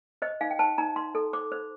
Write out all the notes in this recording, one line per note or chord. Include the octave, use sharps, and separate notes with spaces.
C5 D#5
D#4 F5
G5
C5 A5
D#4 A#5
D#4 C6
A4
C5 D6
C5